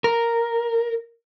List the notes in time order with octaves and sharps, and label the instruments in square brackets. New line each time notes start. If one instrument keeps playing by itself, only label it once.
[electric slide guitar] A#4